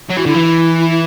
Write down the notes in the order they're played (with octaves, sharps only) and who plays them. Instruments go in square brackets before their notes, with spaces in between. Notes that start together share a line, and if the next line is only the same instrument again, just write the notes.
[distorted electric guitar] F#3
[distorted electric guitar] E3 [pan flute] F#4
[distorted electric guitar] D3 [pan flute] E4
[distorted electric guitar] E3
[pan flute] E4